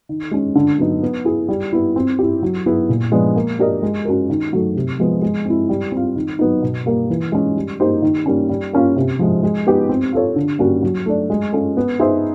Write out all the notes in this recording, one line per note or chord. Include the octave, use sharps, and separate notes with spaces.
D#3
G#3 C#4
D3
F#3 B3 D#4
B3
E4 G#4
G3
B3 E4
C4
E4 G4
F#3
B3 E4 G#4
A#2
F3 G#3 B3 D4
A#3
D4 G4 A#4 D#5
G#3
C#4 F#4 A#4
D#3
F#3 A3
C3
F3 G#3 B3
G#3
C4 E4
G3
C4 F4
D#3
F#3 B3 D#4
B2
G3 A#3
E3
G#3 C#4
G3
A#3 D#4 G4 C5
D#3
G3 A#3 C#4
G3
A#3 C#4 F4
C3
F3 G#3
G#3
B3 D#4 G4
C4
F4 A4 C#5
D3
G3 A#3 C#4 F#4
F#3
A3 D4
G#3
C#4 F4 A4
B3
D#4 G#4 C5 E5